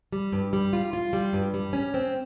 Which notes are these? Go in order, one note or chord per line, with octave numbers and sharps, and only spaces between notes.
G3
G2
G3
F4
F4
G3
G2
G3
C#4
C4